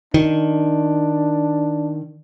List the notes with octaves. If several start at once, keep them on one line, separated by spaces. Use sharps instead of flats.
D#3 D4